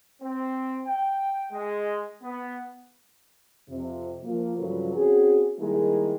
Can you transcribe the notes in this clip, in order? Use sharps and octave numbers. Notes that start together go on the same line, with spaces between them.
C4
G5
G#3
B3
F2 C3
F3 A#3
G2 C#3 F3 F#3 A4 B4
C4 C#4 F#4 G#4
D#3 G3 G#3 A#3 E4 G#4